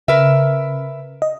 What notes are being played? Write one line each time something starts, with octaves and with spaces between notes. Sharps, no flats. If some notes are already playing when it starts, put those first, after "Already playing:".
C#3 A#4 B4 E5
D#5